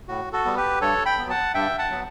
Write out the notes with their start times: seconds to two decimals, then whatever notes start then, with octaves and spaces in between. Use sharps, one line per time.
0.08 A2 F#4
0.33 F#4 A4
0.45 G3 B3
0.57 G4 B4
0.81 G2 A4 C#5
1.05 G5 B5
1.18 F#3 B3
1.30 F#5 A5
1.54 G2 E5 G5
1.78 F#5 A5
1.91 F#3 B3